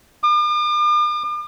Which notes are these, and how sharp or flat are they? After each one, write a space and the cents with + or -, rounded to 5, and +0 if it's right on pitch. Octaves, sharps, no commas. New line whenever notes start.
D6 +45